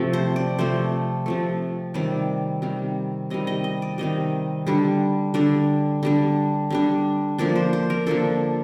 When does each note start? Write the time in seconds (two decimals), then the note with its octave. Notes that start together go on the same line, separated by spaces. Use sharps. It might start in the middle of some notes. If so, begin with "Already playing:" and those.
Already playing: C3 F3 A3
0.13 C5
0.36 D5
0.58 C3 F3 A3 C5
1.26 C3 F3 A3
1.94 C3 D#3 G3 D5
2.62 C3 D#3 G3
3.30 C3 D#3 G3 D#5
3.47 D#5
3.64 D#5
3.82 D5
3.98 C3 D#3 G3 D#5
4.66 D3 G3 D4
5.34 D3 G3 D4 D5
6.03 D3 G3 D4
6.70 D3 G3 D4
7.38 D3 F3 A#3 D4 D5
7.55 C5
7.73 C5
7.90 A#4
8.06 D3 F3 A#3 D4 A4